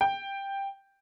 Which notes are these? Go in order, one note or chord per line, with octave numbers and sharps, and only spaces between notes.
G5